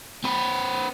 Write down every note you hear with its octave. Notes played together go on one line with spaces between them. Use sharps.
C4 B4